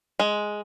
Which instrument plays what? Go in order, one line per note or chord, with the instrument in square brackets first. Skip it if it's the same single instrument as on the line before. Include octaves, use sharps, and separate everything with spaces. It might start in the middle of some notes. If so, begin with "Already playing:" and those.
[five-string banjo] G#3